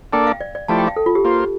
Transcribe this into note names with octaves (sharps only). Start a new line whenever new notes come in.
A#3 D4 A4 D5 G5
F5
D5
D5
F3 A3 E4 G4 D5 A5
G5
F5
A4
F4
G4
A#3 F4 C5